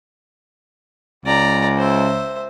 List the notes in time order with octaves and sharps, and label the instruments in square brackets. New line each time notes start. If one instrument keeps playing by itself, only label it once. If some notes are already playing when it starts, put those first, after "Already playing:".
[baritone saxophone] C#2 [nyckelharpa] D5 A#5
[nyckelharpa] C5 E5